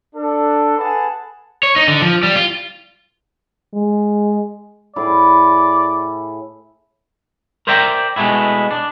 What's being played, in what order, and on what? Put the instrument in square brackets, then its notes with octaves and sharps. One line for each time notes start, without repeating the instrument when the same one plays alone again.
[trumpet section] D4 A4
G#4 A4 B4 F#5 G#5 A5
[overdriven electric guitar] C#5
D#4
D3
F3
G3
F4
[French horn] G#3
[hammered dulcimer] A2 E4 G#4 [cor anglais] D5
[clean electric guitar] A#4 C5 D5 E5 G5 A#5
B2 G#3 A3 B3 E4
D4